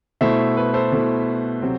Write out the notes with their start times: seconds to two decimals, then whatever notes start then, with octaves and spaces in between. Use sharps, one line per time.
0.21 B2 A3 E4 C5 E5
0.57 B4
0.74 A4 C5
0.92 B2 A3 E4
1.62 C3 F#3 C4